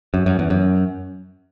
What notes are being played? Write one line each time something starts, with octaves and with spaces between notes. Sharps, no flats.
F#2
F#2
E2
F#2